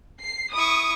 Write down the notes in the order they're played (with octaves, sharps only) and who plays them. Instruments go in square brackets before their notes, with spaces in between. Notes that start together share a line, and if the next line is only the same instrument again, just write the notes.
[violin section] C7
[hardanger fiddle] E4 C#6 [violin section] D#6